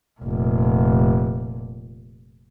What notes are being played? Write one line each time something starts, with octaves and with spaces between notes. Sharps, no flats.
F1 A#2